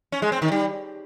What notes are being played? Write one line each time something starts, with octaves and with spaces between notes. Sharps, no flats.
C#4
G#3
C4
D#3
G3